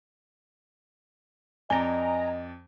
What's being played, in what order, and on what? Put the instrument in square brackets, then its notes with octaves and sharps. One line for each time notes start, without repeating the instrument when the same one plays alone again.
[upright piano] F2 D5 G7 [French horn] D#5 [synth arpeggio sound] G#5 A#5